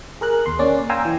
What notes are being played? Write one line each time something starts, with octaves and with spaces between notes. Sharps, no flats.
G#4 A#4 F#6
D#2 C6
A#3 C#4 D5
F5 G5 G#5 A#5 C6 E6
E3